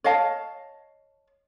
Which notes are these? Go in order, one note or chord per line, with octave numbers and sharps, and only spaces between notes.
C#5 D#5 F5 A5